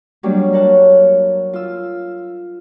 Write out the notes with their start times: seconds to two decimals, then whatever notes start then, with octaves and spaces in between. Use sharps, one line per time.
0.23 F#3 G3 A#3 D4
0.53 A#4 C#5 F#5 A5
1.53 F4 E6